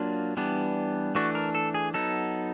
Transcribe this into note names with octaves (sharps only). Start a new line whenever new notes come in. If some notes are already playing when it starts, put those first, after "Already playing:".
Already playing: F#3 A#3 D4 F4
E3 G3 B3 D4
E3 A3 D4 F#4
A#4
A4
G#4
F#3 B3 D#4 A4